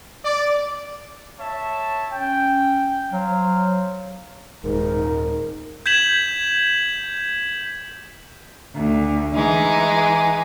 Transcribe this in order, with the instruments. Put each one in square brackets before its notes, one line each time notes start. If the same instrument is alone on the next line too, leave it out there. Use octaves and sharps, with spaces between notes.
[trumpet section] D5
C#5 E5 A5
[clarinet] C#4 [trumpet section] G5
[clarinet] F#3 [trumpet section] C5 F5
[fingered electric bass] D#1 [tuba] G#2 [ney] D#4 [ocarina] A#4
[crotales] G6 G#6 B6 E7 F#7
[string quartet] D2
E3 G#3 D#4